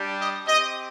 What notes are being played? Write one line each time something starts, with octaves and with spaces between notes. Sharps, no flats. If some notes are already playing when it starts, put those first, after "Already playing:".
Already playing: G3 D4 G4
D#5
C4 G4 D#5